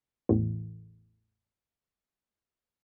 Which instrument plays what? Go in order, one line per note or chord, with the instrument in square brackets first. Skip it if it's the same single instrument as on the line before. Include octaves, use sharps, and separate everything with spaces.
[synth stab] A1 E2 A2